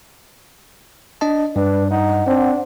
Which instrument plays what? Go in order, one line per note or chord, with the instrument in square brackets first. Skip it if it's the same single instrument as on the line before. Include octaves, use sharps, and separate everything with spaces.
[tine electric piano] D4 D#5 A5
[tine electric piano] G2 [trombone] D4 [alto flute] B4
[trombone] D#4 [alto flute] F#5
[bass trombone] C4 [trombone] D4